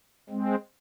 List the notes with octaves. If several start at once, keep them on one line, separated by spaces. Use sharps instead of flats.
G#3 C4